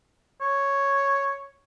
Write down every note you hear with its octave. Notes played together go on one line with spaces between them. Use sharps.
C#5